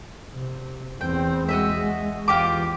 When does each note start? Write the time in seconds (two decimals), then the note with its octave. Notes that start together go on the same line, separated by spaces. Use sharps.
0.33 C3
1.01 E2 C4 G5
1.49 G#3 F#4 D#5 E5
2.28 E2 F4 G4 D6